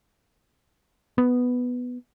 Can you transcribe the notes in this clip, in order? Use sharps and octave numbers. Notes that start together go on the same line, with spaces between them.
B3